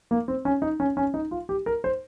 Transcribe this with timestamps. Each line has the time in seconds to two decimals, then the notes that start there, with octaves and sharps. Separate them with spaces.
0.11 A#3
0.28 C4
0.45 C#4
0.62 D#4
0.80 C#4
0.97 C#4
1.14 D#4
1.31 F4
1.49 G4
1.66 A#4
1.84 C5